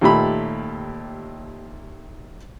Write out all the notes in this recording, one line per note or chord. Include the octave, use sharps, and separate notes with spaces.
D#2 A#2 A3 G4 B5